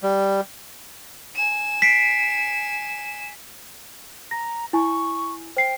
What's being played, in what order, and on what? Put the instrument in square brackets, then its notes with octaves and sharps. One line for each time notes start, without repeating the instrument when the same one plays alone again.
[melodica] G3
[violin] G#5 E7
[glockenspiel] B6 C7 D7
[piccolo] A#5 [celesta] A#6
[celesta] E4 G#5 [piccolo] C#6
[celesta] C5 C7 [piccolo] G5